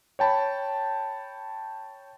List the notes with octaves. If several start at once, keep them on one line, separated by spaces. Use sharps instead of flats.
C#5 G5 A5 B5